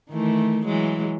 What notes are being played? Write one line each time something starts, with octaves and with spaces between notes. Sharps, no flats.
D#3 E3 A3
E3 F#3 G#3